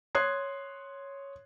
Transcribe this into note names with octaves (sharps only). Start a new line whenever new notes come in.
C#5 C6 D#6 F#6 G#6 C7